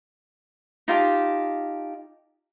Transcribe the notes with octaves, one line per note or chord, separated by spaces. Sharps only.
D#4 F4 G4 A5